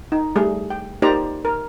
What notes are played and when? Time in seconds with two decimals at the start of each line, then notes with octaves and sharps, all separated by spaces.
0.12 D#4
0.36 G3 A3 G#4
0.70 G5
1.02 A#3 D#4 G4 C5 D5 A#5
1.45 A#4